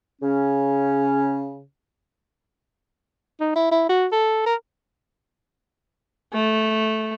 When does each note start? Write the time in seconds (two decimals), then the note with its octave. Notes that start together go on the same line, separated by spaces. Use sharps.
0.22 C#3 C#4
3.41 D#4
3.56 E4
3.72 E4
3.89 F#4
4.12 A4
4.46 A#4
6.33 A3